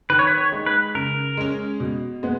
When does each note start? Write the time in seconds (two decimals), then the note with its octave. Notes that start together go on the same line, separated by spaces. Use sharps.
0.10 D#3 B4
0.19 C#5
0.27 B4
0.38 C#5
0.52 G#3 D#4
0.66 B4
0.95 C#3 A#4
1.37 G#3 C#4
1.80 B2
2.23 G#3 B3